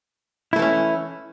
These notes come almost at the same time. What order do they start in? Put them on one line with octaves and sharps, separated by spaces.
E4 A3 E3 C#4